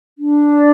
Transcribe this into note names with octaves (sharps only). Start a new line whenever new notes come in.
D4
D5